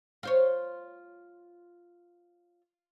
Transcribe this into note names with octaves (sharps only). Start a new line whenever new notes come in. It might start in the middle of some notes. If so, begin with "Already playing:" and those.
F4 C5 C#5